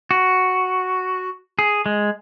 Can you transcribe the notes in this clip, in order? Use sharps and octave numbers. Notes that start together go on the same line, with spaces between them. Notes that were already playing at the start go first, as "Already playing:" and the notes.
F#4
G#4
G#3